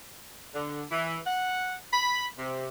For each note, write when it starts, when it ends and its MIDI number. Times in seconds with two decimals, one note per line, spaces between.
0.54 0.83 50
0.90 1.16 52
1.26 1.74 78
1.92 2.25 83
2.37 2.68 48